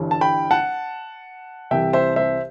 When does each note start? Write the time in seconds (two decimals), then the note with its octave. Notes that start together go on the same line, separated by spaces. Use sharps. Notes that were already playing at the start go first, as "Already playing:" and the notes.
Already playing: G1 G2 E3
0.11 A5
0.21 G5 B5
0.51 F#5 A5
1.71 C2 C3 E3 E5 G5
1.93 C5 E5
2.16 C5 E5